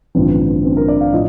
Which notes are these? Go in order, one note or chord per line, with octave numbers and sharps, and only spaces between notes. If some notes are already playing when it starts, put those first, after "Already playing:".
A1 G2 D3 F3 C4
C4
A#4
D5
F5
A2 F3 D#5